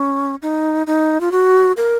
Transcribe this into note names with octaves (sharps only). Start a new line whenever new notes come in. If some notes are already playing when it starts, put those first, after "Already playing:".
Already playing: C#4
D#4
D#4
F4
F#4
A#4